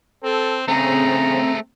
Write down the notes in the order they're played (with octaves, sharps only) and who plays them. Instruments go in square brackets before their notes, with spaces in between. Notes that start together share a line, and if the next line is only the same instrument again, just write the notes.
[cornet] C4 [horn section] A4
[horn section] C#3 [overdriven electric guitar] A3 G#4 [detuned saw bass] C4 [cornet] A#5